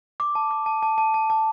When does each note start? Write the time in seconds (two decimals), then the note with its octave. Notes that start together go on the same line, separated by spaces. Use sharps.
0.20 D6
0.35 A5
0.51 D6
0.66 A5
0.83 A5
0.98 A5
1.14 A5
1.30 A5